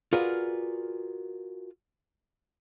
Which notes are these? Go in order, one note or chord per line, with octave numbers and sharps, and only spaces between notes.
F4 F#4 G#4 A#4 B4 D5